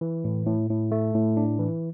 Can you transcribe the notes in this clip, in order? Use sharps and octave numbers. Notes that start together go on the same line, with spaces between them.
E3
A2
A2
A2
A3
A2
D4
E3